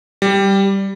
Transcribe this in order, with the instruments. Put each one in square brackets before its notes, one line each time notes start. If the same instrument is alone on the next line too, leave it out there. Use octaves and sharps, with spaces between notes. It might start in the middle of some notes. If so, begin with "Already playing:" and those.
[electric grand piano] G3